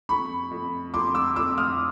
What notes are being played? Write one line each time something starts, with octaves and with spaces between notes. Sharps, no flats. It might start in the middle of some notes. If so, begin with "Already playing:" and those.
F2 B5 C#6
F2
F2 C6 D6
D6 E6
F2 D6 E6
D#6 F6